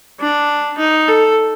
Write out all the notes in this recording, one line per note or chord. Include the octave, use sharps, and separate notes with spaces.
D4
D#4
A4